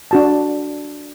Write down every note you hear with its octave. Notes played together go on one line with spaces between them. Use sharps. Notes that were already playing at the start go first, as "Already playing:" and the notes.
D4 F#4 A5